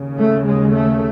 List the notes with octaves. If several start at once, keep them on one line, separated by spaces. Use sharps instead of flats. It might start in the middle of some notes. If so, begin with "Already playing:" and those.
Already playing: D#2 C#3
A3
G#3
A3